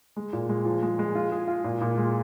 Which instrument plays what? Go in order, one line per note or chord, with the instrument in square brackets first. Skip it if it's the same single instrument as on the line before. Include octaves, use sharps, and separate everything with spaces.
[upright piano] G#3
A#2
G#3
F3
G#3
G#3
F4
G#4
F4
A#2
A#2
G#3